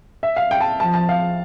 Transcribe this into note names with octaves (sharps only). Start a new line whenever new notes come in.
E5
F5
G5
A5
F3 A5
A5
F5